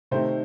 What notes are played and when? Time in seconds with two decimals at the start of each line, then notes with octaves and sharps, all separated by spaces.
0.11 C3 D#3 A3 D#4 C5